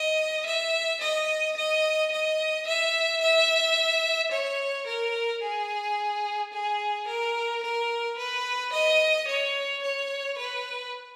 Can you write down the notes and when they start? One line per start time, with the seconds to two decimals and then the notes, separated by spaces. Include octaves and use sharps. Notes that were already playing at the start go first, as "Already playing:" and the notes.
Already playing: D#5
0.46 E5
1.01 D#5
1.57 D#5
2.12 D#5
2.67 E5
3.21 E5
4.32 C#5
4.87 A#4
5.42 G#4
6.53 G#4
7.08 A#4
7.63 A#4
8.18 B4
8.73 D#5
9.28 C#5
9.83 C#5
10.38 B4